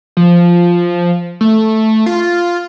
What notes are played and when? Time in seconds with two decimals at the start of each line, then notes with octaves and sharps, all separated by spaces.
0.17 F3
1.41 A3
2.06 F4